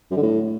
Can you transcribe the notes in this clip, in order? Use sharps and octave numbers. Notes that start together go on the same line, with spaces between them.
F#2
D3
A2